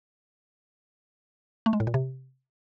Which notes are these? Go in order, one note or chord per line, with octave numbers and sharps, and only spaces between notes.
A3
G#3
A2
A#2
C3